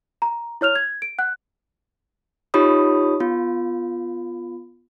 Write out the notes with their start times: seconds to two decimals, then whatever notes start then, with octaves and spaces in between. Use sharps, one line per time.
0.22 A#5
0.61 E4 C#5 F6 F7
0.75 G#6
1.02 D7
1.19 F#5 F#6
2.54 D#4 F4 G4 C#5 B5 D#6
3.20 B3 F4